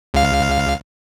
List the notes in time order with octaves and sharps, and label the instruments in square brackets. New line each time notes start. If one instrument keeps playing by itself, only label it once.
[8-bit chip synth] C#2 F5